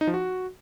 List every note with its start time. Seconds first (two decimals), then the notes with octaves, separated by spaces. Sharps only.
0.01 D#4
0.07 F3
0.14 F#4